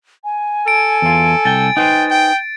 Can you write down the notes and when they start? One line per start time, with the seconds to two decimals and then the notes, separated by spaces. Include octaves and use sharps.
0.24 G#5
0.68 A4 D7
1.02 E2 F4
1.45 C2 G5 A6
1.77 D#4 B4 C5 G5
2.11 G5